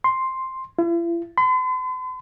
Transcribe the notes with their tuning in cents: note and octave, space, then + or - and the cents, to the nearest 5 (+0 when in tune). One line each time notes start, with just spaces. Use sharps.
C6 +5
E4 +45
C6 -45